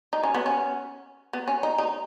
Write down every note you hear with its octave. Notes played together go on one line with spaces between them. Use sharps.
D#4
C#4
B3
C#4
B3
C#4
D#4
D#4